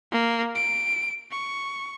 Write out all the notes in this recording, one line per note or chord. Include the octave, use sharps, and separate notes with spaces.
A#3
D7
C#6